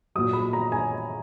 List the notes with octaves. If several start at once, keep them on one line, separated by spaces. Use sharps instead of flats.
A#2 F#3 D#6
B5
A#5
G#5